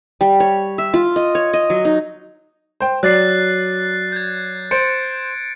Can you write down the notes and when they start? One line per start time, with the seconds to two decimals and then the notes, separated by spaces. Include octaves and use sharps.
0.21 G3
0.40 C#5
0.78 E5
0.94 F4
1.16 D#5
1.35 C#5
1.53 D#5
1.70 F#3
1.85 D#4
2.80 C5 G5
3.03 F#3 D5 F#6 A6 C7
4.12 G6 G#6
4.71 C5 A6 C#7 D7